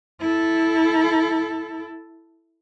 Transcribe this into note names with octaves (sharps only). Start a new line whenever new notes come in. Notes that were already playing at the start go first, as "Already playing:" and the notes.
E4 A4